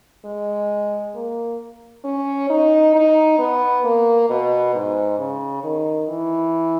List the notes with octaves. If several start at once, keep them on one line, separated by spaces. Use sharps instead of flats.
G#3
A#3
C#4
D#4
D#4
B3
A#3
B2
G#2
C#3
D#3
E3